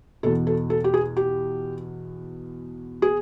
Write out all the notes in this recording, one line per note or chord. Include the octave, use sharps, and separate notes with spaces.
E2 B2 A4
A4
A4
G4
G#4
G4
G#4